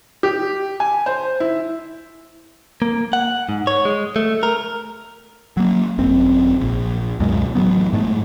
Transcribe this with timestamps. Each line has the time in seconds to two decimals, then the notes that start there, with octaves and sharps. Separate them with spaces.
0.23 G4
0.80 G#5
1.06 C5
1.40 E4
2.82 A#3
3.13 F#5
3.49 G#2
3.67 C#5
3.85 G#3
4.16 A3
4.43 A#4
5.57 F#3 A#3
5.98 G#1 F#2 C4
6.61 A#1
7.20 C#2 F#2 B2 G#3
7.55 A1 F3 F#3 B3
7.93 G#2 G#3 A3